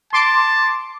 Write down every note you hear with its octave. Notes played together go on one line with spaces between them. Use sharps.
A5 C6 D6